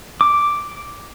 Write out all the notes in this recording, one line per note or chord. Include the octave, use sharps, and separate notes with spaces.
D6